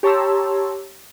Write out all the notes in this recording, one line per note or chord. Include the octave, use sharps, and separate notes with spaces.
G4 C#5 A5 A#5 C6 E6